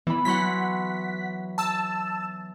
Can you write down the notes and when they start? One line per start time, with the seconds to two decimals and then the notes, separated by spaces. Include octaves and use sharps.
0.07 E3 B3 B5
0.25 E3 F#3 F#5 C6 B6
1.58 A5 E6